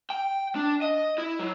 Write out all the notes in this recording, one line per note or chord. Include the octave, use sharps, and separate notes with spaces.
G5
D4
D#5
E4
F#3